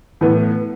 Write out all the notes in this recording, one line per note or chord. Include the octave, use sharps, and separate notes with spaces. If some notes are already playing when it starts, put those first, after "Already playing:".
A2 E3 B3